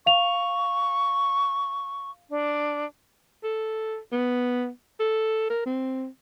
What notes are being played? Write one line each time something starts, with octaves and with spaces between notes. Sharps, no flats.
F5 C#6 F7
D4
A4
B3
A4
A#4
C4